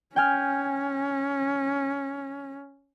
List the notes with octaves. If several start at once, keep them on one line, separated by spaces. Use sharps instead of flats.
C#4 G5 G#5 F6